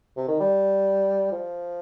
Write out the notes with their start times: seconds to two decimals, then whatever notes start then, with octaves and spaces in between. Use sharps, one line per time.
0.17 C3
0.28 D#3
0.40 G3
1.32 F3